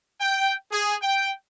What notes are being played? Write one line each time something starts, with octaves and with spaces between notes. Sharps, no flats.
G5
G#4
G5